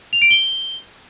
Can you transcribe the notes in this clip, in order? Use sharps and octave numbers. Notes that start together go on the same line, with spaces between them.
F7
D7
G7